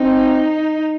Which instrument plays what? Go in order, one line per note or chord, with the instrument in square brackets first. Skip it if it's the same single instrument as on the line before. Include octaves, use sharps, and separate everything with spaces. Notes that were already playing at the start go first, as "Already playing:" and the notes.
Already playing: [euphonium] C4 [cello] D#4